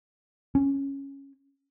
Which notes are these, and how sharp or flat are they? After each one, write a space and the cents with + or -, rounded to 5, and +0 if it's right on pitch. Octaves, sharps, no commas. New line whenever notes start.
C#4 -5